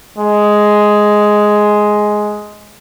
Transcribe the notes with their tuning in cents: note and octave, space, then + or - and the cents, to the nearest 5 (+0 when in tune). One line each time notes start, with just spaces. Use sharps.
G#3 +5